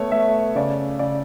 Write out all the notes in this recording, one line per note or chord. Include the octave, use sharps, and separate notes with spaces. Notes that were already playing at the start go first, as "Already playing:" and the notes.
Already playing: A3 B3 C#5
A3 E5
C#3 D5
C#3 D5